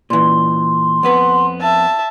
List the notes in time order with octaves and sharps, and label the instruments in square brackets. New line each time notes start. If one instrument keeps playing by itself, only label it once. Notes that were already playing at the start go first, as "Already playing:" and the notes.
[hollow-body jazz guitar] A#2 E3 [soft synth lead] C6
[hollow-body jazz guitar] F2 B3 B4 [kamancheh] F#5
[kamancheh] E5 A5